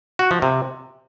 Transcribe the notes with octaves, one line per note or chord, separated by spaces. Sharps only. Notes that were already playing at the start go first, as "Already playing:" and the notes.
F#4
F3
C3